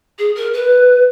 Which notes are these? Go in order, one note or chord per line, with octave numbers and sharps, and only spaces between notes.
G#4
A#4
B4